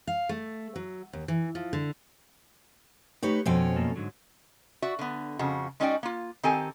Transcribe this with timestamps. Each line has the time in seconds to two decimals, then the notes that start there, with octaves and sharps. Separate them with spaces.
0.07 F5
0.29 A3
0.76 F#3
1.13 D#2
1.28 E3
1.55 F3
1.73 D3
3.23 A3 D#4 G4 B4 C#5
3.46 F2 B2 C#4 C5 G5
3.76 F#2 A#3 A4
3.96 G#2 D3 F#3
4.82 F#4 D5 E5
4.99 D3 B3
5.39 F2 C#3 F#4
5.80 G#3 C#4 D#4 F#4 D5 G5
6.03 A#3 F4
6.43 D#3 C4 G4 A4 G#5